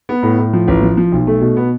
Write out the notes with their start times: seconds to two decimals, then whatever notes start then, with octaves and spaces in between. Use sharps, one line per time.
0.09 B3
0.23 A2
0.38 A2
0.53 F3
0.68 A1
0.82 F3
0.97 F3
1.12 B1
1.27 A3
1.41 B2
1.57 B3